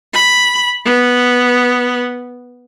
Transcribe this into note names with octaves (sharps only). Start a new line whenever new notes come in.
B5
B3